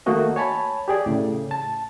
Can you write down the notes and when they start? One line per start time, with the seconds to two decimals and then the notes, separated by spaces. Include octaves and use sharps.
0.06 D#3 A3 A#3 D#4 F#4 D#5
0.36 C#5 G#5 A5 B5
0.88 G4 G#4 D5
1.06 A2 C#3
1.51 A5